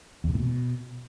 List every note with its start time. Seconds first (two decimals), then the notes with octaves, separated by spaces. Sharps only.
0.24 E2
0.29 C3
0.34 A2
0.40 B2